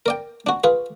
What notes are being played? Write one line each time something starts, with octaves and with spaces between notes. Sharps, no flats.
A#4 D5 G5
D4 F#4
F4 G#4 B4